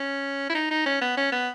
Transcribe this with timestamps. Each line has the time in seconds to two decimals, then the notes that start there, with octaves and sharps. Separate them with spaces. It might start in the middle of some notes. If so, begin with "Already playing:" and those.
Already playing: C#4
0.49 E4
0.55 D#4
0.71 D#4
0.86 C#4
1.01 B3
1.17 C#4
1.32 B3